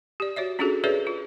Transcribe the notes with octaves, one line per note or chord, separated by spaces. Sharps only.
G4 D5
F#4 C#5 D5 E5
C#4 D4 F4 F#4 G#4 A4
G#4 A4 B4 C#5 D5 E5
F4